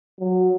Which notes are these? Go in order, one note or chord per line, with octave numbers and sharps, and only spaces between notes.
F#3